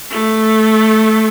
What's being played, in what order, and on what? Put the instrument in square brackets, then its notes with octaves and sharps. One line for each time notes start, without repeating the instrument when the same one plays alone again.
[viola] A3